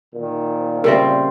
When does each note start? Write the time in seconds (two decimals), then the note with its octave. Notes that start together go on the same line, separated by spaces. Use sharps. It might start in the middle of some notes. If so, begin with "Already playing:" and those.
0.15 A#2 D#3
0.84 C#3 G3 C4 A#4 E5